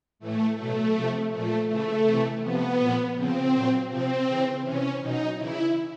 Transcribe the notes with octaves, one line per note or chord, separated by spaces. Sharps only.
A2 E3 A3
B2 F#3 A3
C3 F3
A#2 F3 A3
C#3 E3 A3
C3 E3
C3 F3 B3
A#2 F3
C#3 F3 C4
A#2 F#3
C3 F3 C4
C#3 E3
C3 E3 C#4
B2 F#3 D#4
C#3 E3 E4